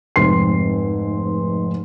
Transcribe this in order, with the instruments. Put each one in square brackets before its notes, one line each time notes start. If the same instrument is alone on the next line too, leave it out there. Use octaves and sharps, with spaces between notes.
[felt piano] F1 G#2 C4 C6 C7